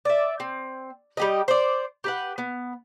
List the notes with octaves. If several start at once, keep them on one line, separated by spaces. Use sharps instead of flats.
D5 E5
C4
G3 G4 D#5
C5 D5
G4 B4 F#5
B3